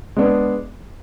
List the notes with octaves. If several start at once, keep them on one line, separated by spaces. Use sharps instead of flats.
G#3 B3 D4